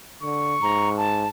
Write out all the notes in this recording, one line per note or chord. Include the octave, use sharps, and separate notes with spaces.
D3 C#6
G#2 A#5
A5